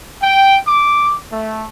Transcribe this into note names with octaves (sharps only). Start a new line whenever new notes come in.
G5
D6
A3